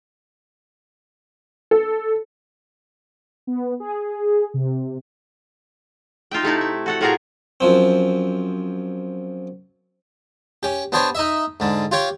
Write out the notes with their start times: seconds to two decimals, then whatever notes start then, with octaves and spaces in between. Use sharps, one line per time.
1.71 A4
3.47 B3
3.80 G#4
4.54 C3
6.31 D#4 F4 E5 G5
6.43 C3 A3 D#4 E4
6.61 E5
6.86 F#4 A4 F#5
7.01 A2 F4 F#4 G#4 A#4 A#5
7.61 F#2 F3 C4
10.63 C#4 G4
10.92 B3 D4 G4 C5 C#5
11.15 D#4 D#5 E5
11.60 G#2 D3
11.91 F4 G4 C#5 D6